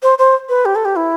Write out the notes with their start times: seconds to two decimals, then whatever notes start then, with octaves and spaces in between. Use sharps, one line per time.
0.03 C5
0.18 C5
0.49 B4
0.65 G4
0.75 A4
0.85 G4
0.96 E4